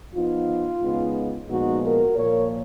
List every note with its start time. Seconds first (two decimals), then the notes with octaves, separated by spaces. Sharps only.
0.15 F3 B3 D#4 F4
0.82 C#3 G#3 B3 D#4
1.48 A#2 F3 G#3 B3 D#4 F#4
1.83 F#4 A#4
2.16 A#2 F3 A#3 A#4 C#5